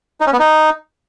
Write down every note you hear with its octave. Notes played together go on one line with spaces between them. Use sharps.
D#4
C#4
B3
D#4